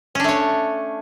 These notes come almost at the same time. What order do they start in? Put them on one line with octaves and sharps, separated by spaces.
C#4 D4 A3 C#5